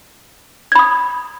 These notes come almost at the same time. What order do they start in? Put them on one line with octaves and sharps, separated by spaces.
G#6 B5 D#6